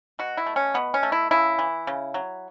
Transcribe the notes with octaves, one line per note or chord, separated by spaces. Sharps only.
B2 F#4
E4
A3
C#4
B2 B3
C#4
A3
E4
C#3 E4
E3
C#3
F#3